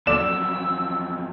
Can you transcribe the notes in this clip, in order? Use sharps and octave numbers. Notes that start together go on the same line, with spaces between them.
F2 F#3 D5 E6 E7